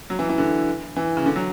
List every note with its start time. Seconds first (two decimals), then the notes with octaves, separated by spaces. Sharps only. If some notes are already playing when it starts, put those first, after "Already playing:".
0.10 F#3
0.19 E3
0.29 E3
0.38 D3
0.96 E3
1.17 C#3
1.26 D3
1.36 F#3